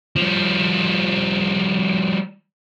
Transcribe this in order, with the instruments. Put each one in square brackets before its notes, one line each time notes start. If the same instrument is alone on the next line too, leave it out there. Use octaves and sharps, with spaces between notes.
[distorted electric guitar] F3 G3